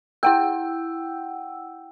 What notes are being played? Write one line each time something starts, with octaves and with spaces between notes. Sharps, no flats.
E4 F#5 G5 E6